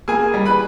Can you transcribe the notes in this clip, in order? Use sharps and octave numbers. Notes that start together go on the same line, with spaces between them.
A#3 G#4 G#5
G3
B4 B5